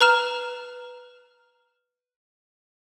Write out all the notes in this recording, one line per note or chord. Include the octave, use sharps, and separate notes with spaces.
B4 A#5 F6 E7